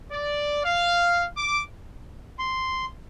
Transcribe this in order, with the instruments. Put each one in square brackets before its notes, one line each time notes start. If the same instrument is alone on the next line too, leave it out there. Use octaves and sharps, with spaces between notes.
[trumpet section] D5
F5
D6
[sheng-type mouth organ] C6